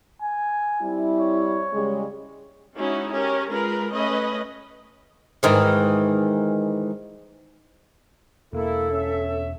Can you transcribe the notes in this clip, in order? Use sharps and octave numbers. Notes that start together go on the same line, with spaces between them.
G#5
G3 C4 E4
C#5
C#3 G3 G#3
G#3 C#4 D#4 E4 F#4
C#4 G4 A#4
G#3 F4 A#4 B4
A3 C#4 B4 D#5
G#2 D#3 E3
E1 A#3 E4 A4
C#4 E5